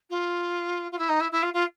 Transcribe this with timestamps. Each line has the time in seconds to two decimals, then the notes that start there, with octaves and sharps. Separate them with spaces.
0.10 F4
0.91 F4
0.98 E4
1.09 D#4
1.20 E4
1.31 E4
1.42 F4
1.53 F4